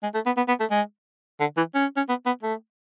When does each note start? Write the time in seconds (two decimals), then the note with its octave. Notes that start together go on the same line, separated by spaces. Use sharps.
0.03 G#3
0.14 A3
0.26 B3
0.37 B3
0.48 B3
0.60 A3
0.71 G#3
1.40 D3
1.57 E3
1.75 C#4
1.97 C#4
2.09 B3
2.26 B3
2.43 A3